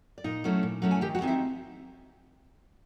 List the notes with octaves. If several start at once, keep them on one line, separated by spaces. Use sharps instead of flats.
D5
A#2 D#4 D#5
F#3 A3 C#4 E4
A#2
F#3 A3 C#4 E4
G#5
D#3 G4 G5
F#4 F#5
G#3 C4 D#4 D#5
E4 E5